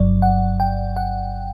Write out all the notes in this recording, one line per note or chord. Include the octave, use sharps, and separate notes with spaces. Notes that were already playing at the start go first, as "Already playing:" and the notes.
Already playing: G1 G2 F#3 D5
F#5
G5
F#5